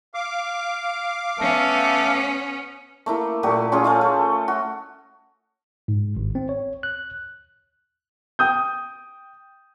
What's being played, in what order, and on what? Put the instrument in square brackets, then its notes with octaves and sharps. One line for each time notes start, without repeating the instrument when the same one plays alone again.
[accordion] F5 D6
[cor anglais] A3 [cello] B3 C#4
[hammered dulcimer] A3 A#3 E4
A#2 A3 F#4 G4
C#4 F4 G#4
A3 F4 D#5
A3
F#4
[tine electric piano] G#2
G#1
C4
C#5
F#6
[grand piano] G5 D#6 G6